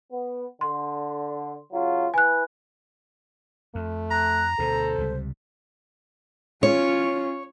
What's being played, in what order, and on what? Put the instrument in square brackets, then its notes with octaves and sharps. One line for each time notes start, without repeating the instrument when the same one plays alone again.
[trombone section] B3
[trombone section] D3 [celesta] C6
[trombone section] C#3 F#3 F4
[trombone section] E4 B4 [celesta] G#5 F#6
[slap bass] F2 [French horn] A3
[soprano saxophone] A#5 [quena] F#6
[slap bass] D2 B2 [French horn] A4 [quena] C5
[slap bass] C#2 C3 G3
[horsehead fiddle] C#4 F4 [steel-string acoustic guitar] C#5